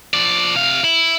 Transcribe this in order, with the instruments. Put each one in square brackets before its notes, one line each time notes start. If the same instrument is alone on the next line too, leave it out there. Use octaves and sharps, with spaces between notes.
[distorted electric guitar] F3 D5
C3 F5
E4